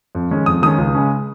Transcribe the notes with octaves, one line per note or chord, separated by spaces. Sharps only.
F2
D#3 G#3 C#4
F2 D#6
D#3 G#3 C#4 D#6
C#2
C#3 G#3 C#4